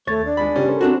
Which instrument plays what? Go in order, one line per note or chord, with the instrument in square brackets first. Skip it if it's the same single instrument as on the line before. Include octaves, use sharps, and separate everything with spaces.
[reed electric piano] D#2 A6 [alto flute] A3 [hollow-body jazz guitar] C#5
[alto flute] D4
[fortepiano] G#3 B5
[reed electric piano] C#3 G4 [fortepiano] G3 C#4
[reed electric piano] A4 A#4 C5
[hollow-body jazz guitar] C4 D4 F#4